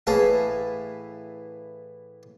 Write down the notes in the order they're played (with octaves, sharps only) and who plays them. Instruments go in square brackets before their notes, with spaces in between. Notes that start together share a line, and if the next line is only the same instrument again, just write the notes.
[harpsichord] A2 E3 G#4 F5 A5